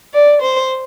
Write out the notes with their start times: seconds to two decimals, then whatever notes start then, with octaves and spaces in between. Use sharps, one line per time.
0.14 D5
0.42 C5